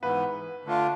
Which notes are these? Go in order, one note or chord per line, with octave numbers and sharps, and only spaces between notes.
G#2 E3 B3 B4
D3 A3 D4 F4